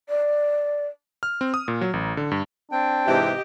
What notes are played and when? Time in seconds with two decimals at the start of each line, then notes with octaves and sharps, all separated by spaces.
0.09 D5
1.23 F6
1.41 C4
1.54 D#6
1.68 A#2
1.81 F#3
1.93 A1
2.17 D3
2.31 G2
2.72 C4 D4 G5
3.06 G#2 C3 E3 G4 D#5